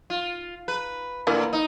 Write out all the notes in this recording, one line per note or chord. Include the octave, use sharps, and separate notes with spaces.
F4
B4
A2 D3 E3 A#3
D#4